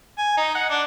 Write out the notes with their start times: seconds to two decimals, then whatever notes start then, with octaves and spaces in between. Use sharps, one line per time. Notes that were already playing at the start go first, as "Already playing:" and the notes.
0.18 G#5
0.37 D#4
0.55 F#5
0.70 D4